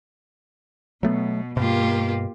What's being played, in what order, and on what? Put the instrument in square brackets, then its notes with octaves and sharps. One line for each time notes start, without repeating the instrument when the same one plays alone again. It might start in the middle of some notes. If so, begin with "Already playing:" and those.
[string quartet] B2 [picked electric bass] F#3 A3 B3
[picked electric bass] G2 B2 [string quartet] A#3 F4 G4